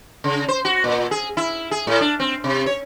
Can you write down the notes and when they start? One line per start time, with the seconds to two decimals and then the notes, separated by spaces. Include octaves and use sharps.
0.24 C#3
0.49 C5
0.65 F#4
0.84 A#2
1.11 G#4
1.37 E4
1.71 G#4
1.87 A2
2.01 D4
2.20 C4
2.44 C3
2.66 C#5